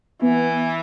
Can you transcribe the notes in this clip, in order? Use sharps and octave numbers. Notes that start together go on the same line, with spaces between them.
E3 B3